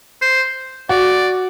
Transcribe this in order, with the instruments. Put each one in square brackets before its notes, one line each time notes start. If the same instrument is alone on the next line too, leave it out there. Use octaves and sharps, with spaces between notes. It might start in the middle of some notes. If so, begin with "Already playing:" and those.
[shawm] C5
[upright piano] F#4 [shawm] D5